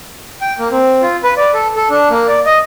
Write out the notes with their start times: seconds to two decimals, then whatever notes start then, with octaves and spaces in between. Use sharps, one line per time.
0.41 G5
0.59 A#3
0.71 C4
1.02 F4
1.24 B4
1.37 D5
1.54 A4
1.76 A4
1.90 D4
2.10 A#3
2.28 D5
2.46 D#5